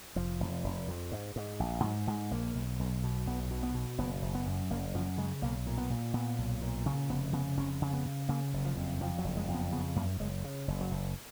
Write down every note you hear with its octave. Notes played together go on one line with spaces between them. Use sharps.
F1 F3
F1
F1
F2
G#2
G#2
A#1
G#2 F#3
G#2 G#3
A#1 A#3
B1
B1
B2
B1 B3
B2
B3
B2
F#1 B3
F#1
B3
F#2
F#1 A#3
F#2 F3
C#3 G#3
B1 A#3
A#2
B3
A#2
A#2 B3
B1
A#2
C#3 C#4
F1 B3
C#3 B3
F1 C#4
C#3
B3
C#3
C#3 A#3
F#1
F3
F2
F2 F3
F#3
F#1
G#3
F2
B3
C#3 B3
F#2 A#3
F#1 G#3
C#3
F#1
F#3
F#1